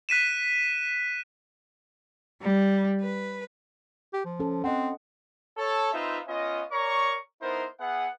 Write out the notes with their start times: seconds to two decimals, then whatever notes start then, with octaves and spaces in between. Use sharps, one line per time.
0.09 F#6 B6 D#7 E7
2.42 G3
3.01 B4
4.13 G4
4.25 F3
4.40 C#4 A4
4.64 C4 D#5 F#5
5.58 A4 C#5
5.93 C4 D#4 F4 B4 C5 E5
6.28 B3 C#4 F4 D#5
6.71 A#4 C#5 D5 A#5 C#6
7.41 B3 D#4 E4 A#4 C5
7.79 B3 G#4 E5 F#5